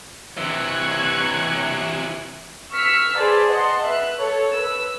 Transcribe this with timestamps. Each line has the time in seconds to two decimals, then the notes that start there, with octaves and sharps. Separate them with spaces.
0.37 C3 E3 C#6 F#6 G#6
2.73 C#6 E6 F6 B6
3.18 G#4 B4 C5 D5 A5
3.49 D#5 F#5 A5 C6
3.82 B4 E5 F#6
4.20 A4 C#5
4.52 B4 E6